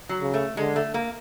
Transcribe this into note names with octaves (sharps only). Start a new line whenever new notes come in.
F#3
C#3
A3
D3 G#3
A3
A#3